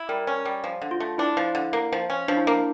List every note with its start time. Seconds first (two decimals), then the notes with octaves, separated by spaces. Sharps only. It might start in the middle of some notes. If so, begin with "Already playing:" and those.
Already playing: E4
0.09 G3 A#4
0.27 C#4
0.45 G3
0.64 F3
0.82 D3
0.91 F4
1.00 A3
1.18 D4 E4
1.37 F3
1.55 D3
1.73 A#3
1.92 F3
2.10 C#4
2.28 F3 D4
2.36 E4
2.45 A#3 D4